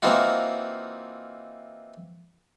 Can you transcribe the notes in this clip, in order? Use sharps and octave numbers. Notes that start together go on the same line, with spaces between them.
E3 A#3 C4 D#4 F4 F#4